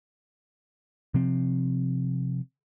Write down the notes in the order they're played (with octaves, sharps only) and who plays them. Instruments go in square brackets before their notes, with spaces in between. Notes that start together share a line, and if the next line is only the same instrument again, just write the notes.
[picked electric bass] C3 F3 C4